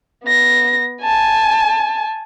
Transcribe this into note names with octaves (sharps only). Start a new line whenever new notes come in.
B3 A#6
G#5 A5